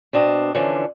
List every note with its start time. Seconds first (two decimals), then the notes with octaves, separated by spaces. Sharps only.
0.13 B2 C4 D4 D#5
0.55 D3 E3 F3 C#4 D4